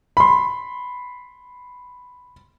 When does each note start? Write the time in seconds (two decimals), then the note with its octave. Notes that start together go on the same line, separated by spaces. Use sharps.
0.17 B5 C6